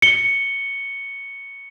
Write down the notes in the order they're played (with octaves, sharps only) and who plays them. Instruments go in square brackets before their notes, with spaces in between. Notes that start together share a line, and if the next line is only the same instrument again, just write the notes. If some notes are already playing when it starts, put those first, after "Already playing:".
[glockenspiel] C#7 G7